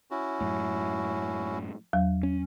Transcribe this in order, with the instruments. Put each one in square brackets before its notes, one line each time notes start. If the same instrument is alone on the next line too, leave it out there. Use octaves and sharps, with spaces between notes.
[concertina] C#4 E4 F#4
[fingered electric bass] F#2 A2
[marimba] E2 F#3
[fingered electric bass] C#4